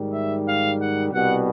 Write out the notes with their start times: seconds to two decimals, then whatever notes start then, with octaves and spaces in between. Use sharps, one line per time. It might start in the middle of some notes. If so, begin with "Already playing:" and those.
Already playing: G#2 D#3 G3
0.12 E5
0.45 F5
0.78 F#5
1.11 C2 B2 G3 F#5